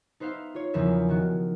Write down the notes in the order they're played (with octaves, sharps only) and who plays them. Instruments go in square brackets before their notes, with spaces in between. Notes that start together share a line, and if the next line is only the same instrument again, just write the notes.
[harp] D#4 B4 C5 E5 F5
F4 C#5
E2 C#3 F3 A#4 E5
D#3 F#4